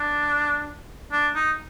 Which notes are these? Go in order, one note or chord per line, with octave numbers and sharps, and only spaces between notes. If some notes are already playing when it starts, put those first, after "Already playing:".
Already playing: D4
D4
D#4